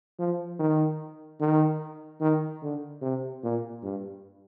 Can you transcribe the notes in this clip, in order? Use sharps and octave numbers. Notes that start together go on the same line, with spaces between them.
F3
D#3
D#3
D#3
D3
C3
A#2
G2